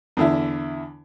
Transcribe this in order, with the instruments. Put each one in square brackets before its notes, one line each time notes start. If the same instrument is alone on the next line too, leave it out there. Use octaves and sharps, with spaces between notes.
[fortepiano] E2 D3 E4